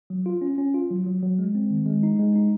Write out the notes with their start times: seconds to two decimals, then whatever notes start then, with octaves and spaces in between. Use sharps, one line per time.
0.10 F#3
0.26 F4
0.41 C#4
0.58 C#4
0.74 F4
0.90 F#3
1.06 F#3
1.22 F#3
1.39 G#3
1.55 C4
1.70 D#3
1.86 G#3
2.03 D#4
2.19 G#3
2.35 D#4